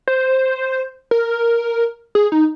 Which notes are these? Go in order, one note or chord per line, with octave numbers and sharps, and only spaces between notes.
C5
A#4
G#4
D#4